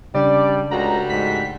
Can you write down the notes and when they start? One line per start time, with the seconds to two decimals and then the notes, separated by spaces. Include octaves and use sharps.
0.15 C#3 G3 D4 D5
0.71 C#2 G3 A3 F#4 A#5
1.09 G#2 B6